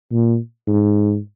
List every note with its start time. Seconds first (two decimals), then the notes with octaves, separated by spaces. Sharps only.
0.11 A#2
0.67 G#2